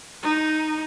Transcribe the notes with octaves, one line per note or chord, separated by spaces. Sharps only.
D#4